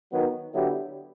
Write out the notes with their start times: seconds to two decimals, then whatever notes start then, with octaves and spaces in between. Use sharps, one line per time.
0.10 D#3 F#3 B3
0.53 D3 F#3 B3 E4 G4